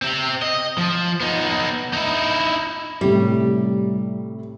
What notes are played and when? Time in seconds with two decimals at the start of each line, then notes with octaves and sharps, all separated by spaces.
0.02 C4 G4
0.42 D#5
0.78 F3
1.21 B3 D#4
1.93 D#4 E4
3.01 A2 C3 G3